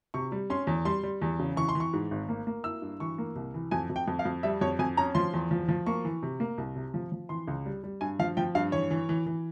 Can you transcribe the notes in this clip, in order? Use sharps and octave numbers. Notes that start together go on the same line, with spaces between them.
C3 C#6
G3
C#4 C6
E2
G3 C6
G3
E2
C#3
E3 C#6
C6
E3
C#6
G#2
G#1
A#3
A#3
E4 E6
G2
E3 C#6
A#3
C2
E3
F2 G#5
F2
G5
F2
F5
F2
G3 E5
F2 C#5
F2 G#5
C#4 A#5
F3 C6
E2
F3
F3
A#3 C#6
E3
C3
A#3
C2
C3
F3
F3
E3 C6
C#2
G3
G3
G2 G#5
F3 F5
F3 G5
G2 F5
E3 C#5
E3
E3
E3